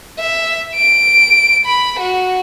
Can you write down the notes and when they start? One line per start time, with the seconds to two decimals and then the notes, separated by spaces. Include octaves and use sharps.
0.19 E5
0.75 D7
1.65 B5
2.00 F#4